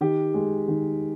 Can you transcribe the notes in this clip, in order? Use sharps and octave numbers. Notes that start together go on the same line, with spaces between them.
D#3 G4
G#3
D#3